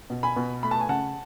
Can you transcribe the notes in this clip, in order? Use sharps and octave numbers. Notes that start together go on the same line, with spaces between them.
B2
G#5 B5
B2
A3 B5
A5
G#5
C#3 F#5 A5